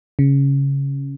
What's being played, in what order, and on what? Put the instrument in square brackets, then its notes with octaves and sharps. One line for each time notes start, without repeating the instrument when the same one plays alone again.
[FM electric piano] C#3